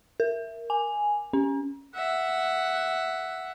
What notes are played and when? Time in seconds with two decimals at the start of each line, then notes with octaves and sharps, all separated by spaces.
0.20 A#4
0.70 G#5
1.33 C#4
1.94 E5 F#5